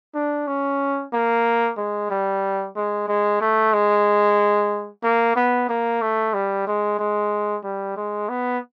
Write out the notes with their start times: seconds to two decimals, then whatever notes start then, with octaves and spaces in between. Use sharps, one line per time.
0.15 D4
0.47 C#4
1.13 A#3
1.77 G#3
2.10 G3
2.76 G#3
3.08 G#3
3.41 A3
3.73 G#3
5.03 A#3
5.36 B3
5.69 A#3
6.01 A3
6.34 G3
6.67 G#3
6.99 G#3
7.64 G3
7.97 G#3
8.29 B3